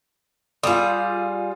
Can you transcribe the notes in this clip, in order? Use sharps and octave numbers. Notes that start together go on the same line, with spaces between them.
G3 F4 G#4 D#6